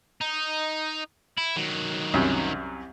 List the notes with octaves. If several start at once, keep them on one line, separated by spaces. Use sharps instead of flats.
D#4
E4
D#3 F#3
C2 F#2